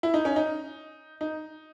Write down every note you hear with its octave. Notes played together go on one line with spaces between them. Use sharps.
E4
D#4
C#4
D#4
D#4